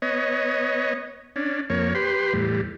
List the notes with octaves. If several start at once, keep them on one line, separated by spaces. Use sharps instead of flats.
B3 C#5 D#5
C#4 D4
F2 A#3 C#5
G4 B4 C6
E2 A2 G3